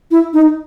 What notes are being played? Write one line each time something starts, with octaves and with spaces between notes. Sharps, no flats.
E4
D#4